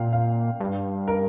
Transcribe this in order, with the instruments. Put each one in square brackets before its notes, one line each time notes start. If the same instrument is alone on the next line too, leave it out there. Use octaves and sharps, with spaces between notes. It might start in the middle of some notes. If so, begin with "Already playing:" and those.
Already playing: [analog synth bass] A#2 [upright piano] F5 G5
[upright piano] F5
[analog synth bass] G2
[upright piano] A#4